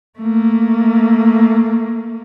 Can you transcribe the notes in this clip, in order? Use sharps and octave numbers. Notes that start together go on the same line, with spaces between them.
A3 A#3